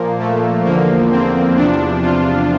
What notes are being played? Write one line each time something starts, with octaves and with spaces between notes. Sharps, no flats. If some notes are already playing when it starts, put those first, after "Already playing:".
Already playing: A#2 F3 A#3
A3
E2 D3 F3 A#3
C4
E2 C3 F3 D4
F4